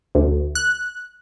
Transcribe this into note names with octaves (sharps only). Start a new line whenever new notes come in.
D2
F#6